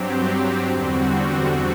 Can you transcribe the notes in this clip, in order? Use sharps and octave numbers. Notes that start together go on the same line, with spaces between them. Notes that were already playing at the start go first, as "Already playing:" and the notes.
Already playing: G2 F#3 C4 G4
E2 D3 G3 C4 F#4